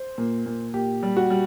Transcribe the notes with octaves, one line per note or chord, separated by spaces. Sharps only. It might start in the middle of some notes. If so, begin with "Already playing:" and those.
Already playing: C5
A#2
A#2
A#2 G4
G3
F#4
G3